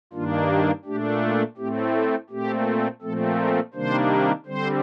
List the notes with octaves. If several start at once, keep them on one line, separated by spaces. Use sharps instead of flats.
G2 D#3 A#3 D4 F4
G4
A#2 A3 D4 G4
F4
A2 A3 C4 G4
A4
A#2 A3 C4 G4
A#2 F3 A3 C4 A4
A#4
C3 D#3 G3 A#3 D4 C5
D3 G3 C4 C5